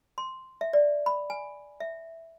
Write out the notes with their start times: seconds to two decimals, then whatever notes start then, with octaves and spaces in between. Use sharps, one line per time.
0.18 C6
0.61 E5
0.73 D5
1.06 B5
1.30 G#5
1.80 E5